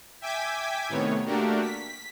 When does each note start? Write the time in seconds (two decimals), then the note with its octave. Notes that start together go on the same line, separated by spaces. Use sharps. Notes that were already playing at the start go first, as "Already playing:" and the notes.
0.21 E5 G5 G#5 D6 G#6 B6
0.89 A2 C3 D#3 B3 C#5
1.25 A3 A#3 D4 F#4 G4 A#4
1.62 B6